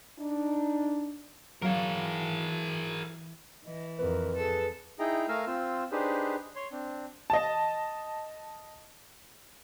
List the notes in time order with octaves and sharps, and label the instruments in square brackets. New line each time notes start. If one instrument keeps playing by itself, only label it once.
[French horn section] D4 D#4
[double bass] E3 [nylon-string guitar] F#3 F5 [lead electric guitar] G#4 A#4
[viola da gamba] E3 [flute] D#5
[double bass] F2 [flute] A#4 [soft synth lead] B4
[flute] G#4 [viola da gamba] A4
[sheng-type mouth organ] D#4 E4 G#4 G5 A#5
A3 A#4 F5 G#5 A#5 E6
C4 F4 E6
D4 D#4 G4 G#4 B4 C5
C#5 C6
C4 D4
[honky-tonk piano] D#5 A5